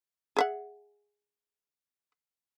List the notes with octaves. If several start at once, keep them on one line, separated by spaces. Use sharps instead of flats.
G#4 E5 F#5